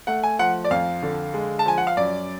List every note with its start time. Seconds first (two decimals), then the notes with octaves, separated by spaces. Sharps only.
0.07 A3 F#5
0.23 G#5
0.39 F3 F#5
0.64 D5
0.71 F2 F5
1.03 D3
1.34 G#3
1.59 A5
1.66 F3 G#5
1.78 F#5
1.87 F5
1.97 F#2 D5